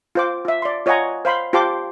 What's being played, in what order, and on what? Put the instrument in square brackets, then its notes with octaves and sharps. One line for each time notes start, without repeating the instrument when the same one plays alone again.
[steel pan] F4 C5 D6
F4 E5
D5 C6
F4 C#5 D#5 F#5 G#5 A#5
C5 F5 B5 C6
F4 G4 C5 A5 C6 D6